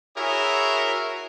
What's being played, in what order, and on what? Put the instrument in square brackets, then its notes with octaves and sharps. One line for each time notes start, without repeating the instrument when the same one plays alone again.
[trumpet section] E4 F#4 G#4 A#4 C#5 E5